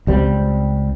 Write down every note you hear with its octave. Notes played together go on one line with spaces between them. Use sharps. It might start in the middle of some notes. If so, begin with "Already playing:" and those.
C#2 G3 C4